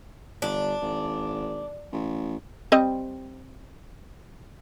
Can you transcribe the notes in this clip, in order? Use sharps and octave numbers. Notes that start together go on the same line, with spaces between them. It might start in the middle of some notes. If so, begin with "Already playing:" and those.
G1 D4
G#1
A1
G3 C4 D#5